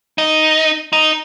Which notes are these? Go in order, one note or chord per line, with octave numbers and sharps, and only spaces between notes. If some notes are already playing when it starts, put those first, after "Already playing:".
D#4
D#4